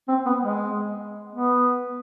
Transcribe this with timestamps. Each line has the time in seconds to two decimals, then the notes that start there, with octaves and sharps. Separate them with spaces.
0.08 C4
0.26 B3
0.43 G#3
1.32 B3